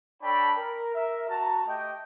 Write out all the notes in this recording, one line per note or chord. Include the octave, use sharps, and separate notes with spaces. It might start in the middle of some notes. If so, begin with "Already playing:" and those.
D4 A4 C#5 G5 A5 B5
A#4
A#4 E5
F#4 A5 A#5
A3 G4 D#5 G5